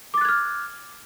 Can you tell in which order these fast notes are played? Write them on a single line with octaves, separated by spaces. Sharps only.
D6 A6 F#6 G#6 F6